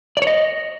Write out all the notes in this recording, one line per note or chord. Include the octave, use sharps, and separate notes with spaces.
D5
C#5
D#5